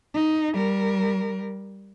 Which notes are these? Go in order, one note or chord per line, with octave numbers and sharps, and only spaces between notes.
D#4
G3 A#4